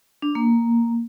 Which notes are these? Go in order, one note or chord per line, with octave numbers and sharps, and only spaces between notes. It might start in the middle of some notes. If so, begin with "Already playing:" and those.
D4
A#3